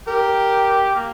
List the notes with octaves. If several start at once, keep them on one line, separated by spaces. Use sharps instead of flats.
G4 A#4
A#3